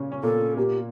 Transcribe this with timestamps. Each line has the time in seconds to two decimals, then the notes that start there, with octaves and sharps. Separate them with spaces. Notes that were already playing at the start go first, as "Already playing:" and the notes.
Already playing: A#2 C#3 C#4
0.12 C#4
0.23 A#2 A#3 A4
0.57 A#2 A#3 G4